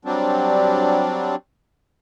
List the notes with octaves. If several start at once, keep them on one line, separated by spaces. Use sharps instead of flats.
F#3 G3 C4 D4